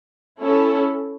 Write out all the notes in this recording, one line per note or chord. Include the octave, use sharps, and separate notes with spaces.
C#4 E4 A4